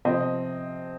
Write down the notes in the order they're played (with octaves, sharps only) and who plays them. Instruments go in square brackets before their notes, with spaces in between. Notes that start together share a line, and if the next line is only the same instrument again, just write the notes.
[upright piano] C3 F3 C4 D#5